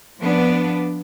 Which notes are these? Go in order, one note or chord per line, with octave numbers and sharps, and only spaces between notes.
F3 B3 D4